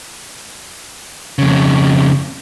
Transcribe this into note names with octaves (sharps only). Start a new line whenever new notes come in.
F2 C#3